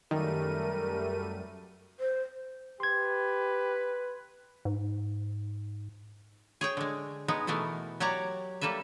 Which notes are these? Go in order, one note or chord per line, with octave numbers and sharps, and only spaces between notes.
F#2 D#3 G3 A3 A#4 D#7
C5
G4 B4 C6 G#6
G#2
G#4 C#5 G5
D3 G#3
G#3 B3 D#4
B2 E3 A3 B3 A#4
F#3 G4 C#5 D5 F#5 A#5
G3 A#3 A4 B4 E5